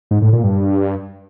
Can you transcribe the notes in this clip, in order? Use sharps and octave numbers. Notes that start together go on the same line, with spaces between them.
G#2
A2
A#2
G2